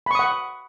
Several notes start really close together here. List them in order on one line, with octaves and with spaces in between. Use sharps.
B5 C#6 D#6 F#5